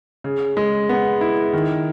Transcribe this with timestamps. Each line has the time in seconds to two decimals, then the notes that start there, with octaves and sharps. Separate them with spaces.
0.24 C#3
0.57 G#3
0.89 B3
1.21 E4
1.53 D#3